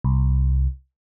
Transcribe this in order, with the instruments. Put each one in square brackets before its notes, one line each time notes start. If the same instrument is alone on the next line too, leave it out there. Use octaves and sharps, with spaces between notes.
[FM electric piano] C2